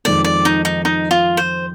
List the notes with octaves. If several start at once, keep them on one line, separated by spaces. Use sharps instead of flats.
F2 D#3 G#3 D5
D5
D#4
D#4
D#4
F4
C5